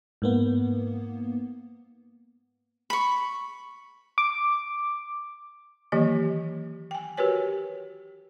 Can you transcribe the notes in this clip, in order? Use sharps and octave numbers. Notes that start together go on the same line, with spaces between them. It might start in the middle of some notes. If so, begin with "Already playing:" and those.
G#2 A#3 B3
B5 C#6
D6
D#3 E3 F#3 A#3 G4 D#5
G5 G#5
F#4 G4 A#4 B4 C#5 G#5